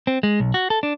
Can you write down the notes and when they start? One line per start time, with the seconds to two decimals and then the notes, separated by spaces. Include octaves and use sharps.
0.07 C4
0.23 G#3
0.40 B1
0.54 F#4
0.70 A4
0.83 D4